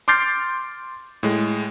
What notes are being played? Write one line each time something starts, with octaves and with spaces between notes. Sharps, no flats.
C6 D6 F6 G6 A6 C7
A2 G#3